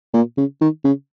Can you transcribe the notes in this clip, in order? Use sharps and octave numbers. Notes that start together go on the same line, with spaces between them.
A#2
C#3
D#3
C#3